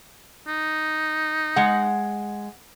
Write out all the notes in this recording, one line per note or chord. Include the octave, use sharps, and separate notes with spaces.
D#4
G#3 F#5